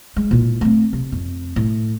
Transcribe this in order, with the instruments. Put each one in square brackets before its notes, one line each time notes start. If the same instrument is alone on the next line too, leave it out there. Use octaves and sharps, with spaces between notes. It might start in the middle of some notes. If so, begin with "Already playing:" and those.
[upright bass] G#3
A#2 E4
A3 C4
C3
F2
A2